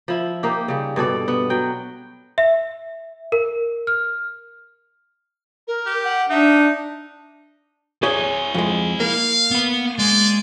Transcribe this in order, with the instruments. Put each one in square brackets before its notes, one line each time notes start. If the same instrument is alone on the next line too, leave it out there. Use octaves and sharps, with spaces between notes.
[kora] F3 E4
A#3 D#4 G4
C#3 G3
G2 B2 A4 D5
B3
F#3 G5
[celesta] E5
A#4
F6
[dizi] A#4
[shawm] G4
[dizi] F#5
[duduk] D4 [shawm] D#4 [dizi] E5
[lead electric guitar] E4 D5 [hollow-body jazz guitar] G#4 C#5
[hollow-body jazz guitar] F2 G#3
[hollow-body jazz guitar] A#3 [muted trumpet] F5
[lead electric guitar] B3 F#5
[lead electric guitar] G#3 [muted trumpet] D5